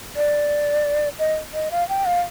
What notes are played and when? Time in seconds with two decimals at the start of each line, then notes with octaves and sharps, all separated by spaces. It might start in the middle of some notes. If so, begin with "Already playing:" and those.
0.16 D5
1.19 D#5
1.54 D#5
1.71 F5
1.89 G5
2.06 F5